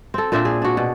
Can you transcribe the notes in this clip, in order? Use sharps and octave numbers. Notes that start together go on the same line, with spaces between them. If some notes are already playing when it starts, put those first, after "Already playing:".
C4 A4
A#2 C4 D4 E5
G#4
D4 F#4
B2